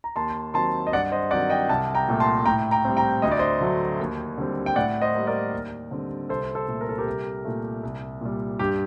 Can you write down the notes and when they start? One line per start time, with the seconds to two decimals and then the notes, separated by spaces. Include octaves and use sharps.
0.04 A#5
0.16 D#2 A5 C6
0.54 D#3 F#3 C4 A5 C6
0.87 D#5
0.93 G2 D5 F#5
1.12 C5 D#5
1.31 D#3 F#3 C4 D5 F#5
1.50 D#5 G5
1.69 C2 F#5 A5
1.95 G5 A#5
2.08 A#2 A3
2.20 A5 C6
2.46 A2 G5 A#5
2.71 G5 A#5
2.85 G3 C4
2.97 G5 A#5
3.22 D2 D#5
3.32 D5
3.39 C5 D#5
3.61 D3 F#3 A3
4.00 D#2
4.38 D3 G3 C4
4.66 G5
4.76 A2 D5 F#5
5.02 C5 D#5
5.14 G3 A#3
5.27 A#4 D5
5.52 D#2
5.91 D3 G3 C4
6.29 C2 A4 C5
6.55 A4 C5
6.67 A#2 A3
6.81 A#4
6.89 A4
6.98 G4 A#4
7.06 C2
7.45 A#2 A3
7.83 C2
8.21 A#2 G3
8.59 G2 G4